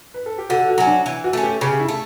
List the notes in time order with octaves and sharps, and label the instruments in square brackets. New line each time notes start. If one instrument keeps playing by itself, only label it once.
[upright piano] B4
A4
G4
[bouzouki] D3 [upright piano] F#4
[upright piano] F#4
[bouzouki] F#3 C#4
[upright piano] D4
[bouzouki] E3
[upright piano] F#4
[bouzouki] A3 C#4
[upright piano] G4
[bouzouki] C#3 [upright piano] G4
[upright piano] E4
[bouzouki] A3